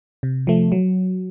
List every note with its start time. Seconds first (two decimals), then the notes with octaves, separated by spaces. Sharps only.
0.23 C3
0.47 F3 A3
0.72 F#3